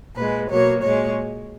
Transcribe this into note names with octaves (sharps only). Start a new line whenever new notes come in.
A#2 G#3 B4
B2 F#3 A#3 C#5
A#2 G#3 C#5